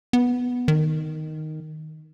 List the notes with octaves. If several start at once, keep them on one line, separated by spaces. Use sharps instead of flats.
B3
D#3